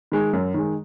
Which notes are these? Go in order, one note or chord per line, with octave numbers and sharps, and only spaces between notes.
D#3 G#3
F#2
D#3 G#3